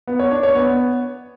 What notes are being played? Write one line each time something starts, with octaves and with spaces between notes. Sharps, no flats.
B3
C#5
D4
C#5
B3